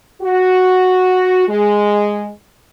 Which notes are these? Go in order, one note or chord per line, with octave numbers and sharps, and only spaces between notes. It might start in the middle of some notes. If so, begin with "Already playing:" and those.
F#4
G#3